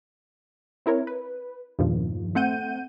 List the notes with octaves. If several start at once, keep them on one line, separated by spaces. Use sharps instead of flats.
C4 E4 A#4 C#5
B4
E2 G2 A#2 D#3 F3
A3 C4 F#5 G6 D#7